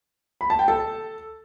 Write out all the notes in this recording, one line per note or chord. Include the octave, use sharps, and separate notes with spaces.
B5
A5
G5
A4 A5